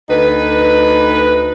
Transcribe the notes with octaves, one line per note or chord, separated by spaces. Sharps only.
D2 D#4 B4